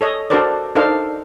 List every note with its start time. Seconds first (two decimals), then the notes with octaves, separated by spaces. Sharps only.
0.01 A4 C#5 D#5
0.30 D4 F#4 A4 A#4 C5 D5
0.75 D4 D#4 A4 A#4 C5 F5